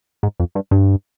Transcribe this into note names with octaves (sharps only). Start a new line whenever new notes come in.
G#2
F2
G2
G2